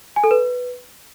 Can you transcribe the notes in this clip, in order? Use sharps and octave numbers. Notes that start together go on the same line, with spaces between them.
G#5
A4
B4